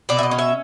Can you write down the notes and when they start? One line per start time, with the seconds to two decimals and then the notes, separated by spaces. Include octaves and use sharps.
0.09 B2 D5
0.19 E5
0.23 D#5
0.31 C#4
0.38 E5